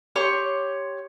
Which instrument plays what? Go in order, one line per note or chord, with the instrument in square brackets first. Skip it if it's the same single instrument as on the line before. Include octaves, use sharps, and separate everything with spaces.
[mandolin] G4 C#5 C6 C#6